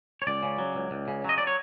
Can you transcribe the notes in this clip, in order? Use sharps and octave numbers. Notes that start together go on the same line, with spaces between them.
C#5
C#2 D5
C#3
F#3
C#2
C#2
C#3
F#3 D#5
D5
C#5